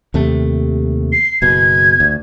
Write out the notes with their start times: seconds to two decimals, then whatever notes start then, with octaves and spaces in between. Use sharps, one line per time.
0.14 D#2 C3 A3
1.12 C7
1.42 F#1 B2 G#6
2.00 D2